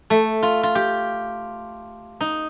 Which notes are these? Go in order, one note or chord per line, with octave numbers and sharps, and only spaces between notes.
A3
F4
F4
G4
D#4